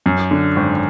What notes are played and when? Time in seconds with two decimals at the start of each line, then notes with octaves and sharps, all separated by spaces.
0.06 F#2
0.31 D3
0.56 G#1